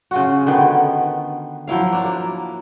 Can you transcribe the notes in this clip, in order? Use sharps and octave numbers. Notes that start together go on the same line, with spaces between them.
C#3 F4 F#4
D3 D#3 B3
F3 F#3 E4 F5
A#3 D4